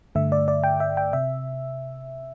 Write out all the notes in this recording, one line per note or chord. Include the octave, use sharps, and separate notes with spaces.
G2 D3 A3 E5
D5
D5
G5
E5
G5
C3 E5